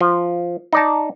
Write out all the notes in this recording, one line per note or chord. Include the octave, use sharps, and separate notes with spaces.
F3
D#4 D5 A5